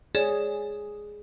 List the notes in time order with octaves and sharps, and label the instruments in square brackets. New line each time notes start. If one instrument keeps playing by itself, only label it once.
[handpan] G#4 [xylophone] C#5 D5 E7